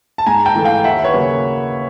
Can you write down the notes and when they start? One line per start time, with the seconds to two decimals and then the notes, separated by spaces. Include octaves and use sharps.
0.18 A5
0.26 G#2 G#5 A#5
0.45 G5 A5
0.55 E3 A3
0.64 F5 G5
0.84 D#2 E5 F#5
1.04 B4 C#5
1.13 C#3 F#3 A#3